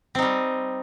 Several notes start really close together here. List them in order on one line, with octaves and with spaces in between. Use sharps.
C4 D#4 G3